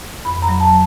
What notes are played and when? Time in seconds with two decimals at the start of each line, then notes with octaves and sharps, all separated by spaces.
0.25 F2 B5
0.42 A#5
0.48 F#3
0.60 A5